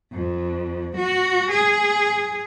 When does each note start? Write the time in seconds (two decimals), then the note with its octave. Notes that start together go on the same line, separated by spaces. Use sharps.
0.13 F2
0.97 F#4
1.51 G#4